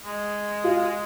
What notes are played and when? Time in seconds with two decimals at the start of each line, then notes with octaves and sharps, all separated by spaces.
0.04 G#3
0.64 F4